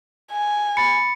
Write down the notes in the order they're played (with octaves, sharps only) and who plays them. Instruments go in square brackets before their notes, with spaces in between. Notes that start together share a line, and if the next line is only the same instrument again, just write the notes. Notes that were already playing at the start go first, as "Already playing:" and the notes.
[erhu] G#5
[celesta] B5 A6 [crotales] C#7